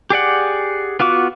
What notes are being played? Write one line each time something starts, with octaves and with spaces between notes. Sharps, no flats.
G4 G#4 D5 F#5
B3 F4 F#4 D6